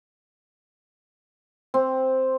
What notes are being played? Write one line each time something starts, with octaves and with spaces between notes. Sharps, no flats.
C4